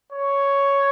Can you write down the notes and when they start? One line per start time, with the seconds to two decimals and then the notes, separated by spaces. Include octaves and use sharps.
0.12 C#5